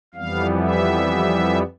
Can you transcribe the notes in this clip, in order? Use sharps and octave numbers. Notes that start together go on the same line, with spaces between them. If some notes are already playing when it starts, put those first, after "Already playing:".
F2 E3 G3 B3 F5
E5